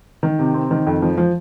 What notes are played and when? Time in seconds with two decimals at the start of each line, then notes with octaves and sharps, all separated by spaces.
0.23 D#3
0.39 C3
0.54 C4
0.71 D#3
0.87 F2
1.02 F3
1.18 F3